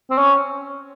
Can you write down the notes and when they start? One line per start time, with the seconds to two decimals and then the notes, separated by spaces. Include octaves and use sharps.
0.10 C4
0.18 C#4